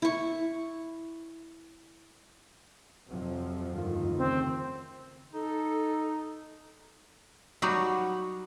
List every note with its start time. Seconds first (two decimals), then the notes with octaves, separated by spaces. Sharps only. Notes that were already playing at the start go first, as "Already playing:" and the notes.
0.02 E4 C#6
3.09 F2 C3 F3 F#3
3.74 D2 G2 D#3 F4
4.18 C#3 C4
5.34 D#4 A4
7.62 F#3 G3 D#4 F#4